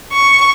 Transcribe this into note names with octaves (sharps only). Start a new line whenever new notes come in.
C#6